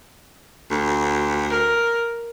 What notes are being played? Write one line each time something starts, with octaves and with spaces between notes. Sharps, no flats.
D2
A#4